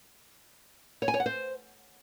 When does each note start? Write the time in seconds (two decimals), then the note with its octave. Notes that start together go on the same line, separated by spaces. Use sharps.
1.02 C#5
1.08 G#5
1.14 C#5
1.20 F#5
1.26 C5